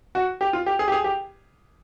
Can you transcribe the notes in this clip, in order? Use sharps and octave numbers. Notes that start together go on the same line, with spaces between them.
F#4
G4
F4
G4
G#4
G4
G#4
G4